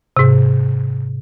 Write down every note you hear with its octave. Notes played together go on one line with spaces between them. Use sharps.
G#2 C3